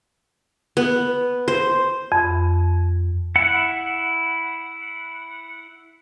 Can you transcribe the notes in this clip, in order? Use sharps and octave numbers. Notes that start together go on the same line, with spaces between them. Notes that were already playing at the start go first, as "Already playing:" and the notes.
B3
C5
F2
E4 F#5